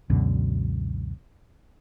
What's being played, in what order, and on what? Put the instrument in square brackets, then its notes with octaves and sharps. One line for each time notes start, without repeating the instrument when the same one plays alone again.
[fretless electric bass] C#2 F#2 B2 D3